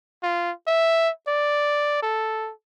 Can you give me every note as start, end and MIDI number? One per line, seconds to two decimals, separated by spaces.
0.23 0.52 65
0.67 1.10 76
1.28 2.00 74
2.03 2.51 69